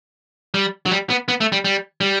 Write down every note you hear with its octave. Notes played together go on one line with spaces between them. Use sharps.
G3
F#3
G3
B3
B3
A3
G3
G3
G3